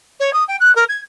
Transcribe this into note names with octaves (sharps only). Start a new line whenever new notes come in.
C#5
D#6
G5
F#6
A#4
G#6